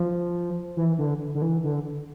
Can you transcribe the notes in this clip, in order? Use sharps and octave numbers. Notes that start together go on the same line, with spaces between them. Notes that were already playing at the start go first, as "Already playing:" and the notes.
Already playing: F3
E3
D3
D3
E3
D3